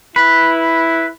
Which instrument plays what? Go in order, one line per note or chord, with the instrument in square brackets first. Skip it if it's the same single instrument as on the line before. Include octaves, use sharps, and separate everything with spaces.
[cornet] E4 [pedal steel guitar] B4